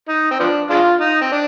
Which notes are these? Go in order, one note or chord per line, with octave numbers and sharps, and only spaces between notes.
D#4
C4
F3 B3 D4
G#3 D4 F4
D#4
C4
D4